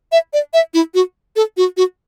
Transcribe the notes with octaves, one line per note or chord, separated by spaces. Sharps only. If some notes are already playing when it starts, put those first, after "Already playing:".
E5
D5
E5
E4
F#4
A4
F#4
F#4